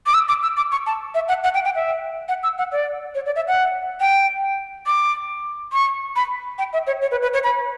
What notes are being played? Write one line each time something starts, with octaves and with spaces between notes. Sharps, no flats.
D6
E6
D6
E6
D6
C#6
A5
E5
F#5
F#5
G5
G5
E5
F#5
E6
F#5
D5
C#5
D5
E5
F#5
G5
D6
C#6
B5
G5
E5
C#5
C#5
B4
B4
C#5
B5